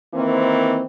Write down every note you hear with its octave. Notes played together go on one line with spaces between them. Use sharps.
D#3 E3 A#3 C4